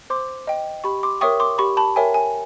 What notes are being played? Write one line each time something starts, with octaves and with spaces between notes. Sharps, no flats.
C5 C6 D6
D#5 G5
G4 B5 C#6
C6 D6
A#4 C#5 E5 G5 C#6 D#6
C6 D6
G4 B5 C#6
A5 B5
A#4 C#5 E5 G5 G#5
G#5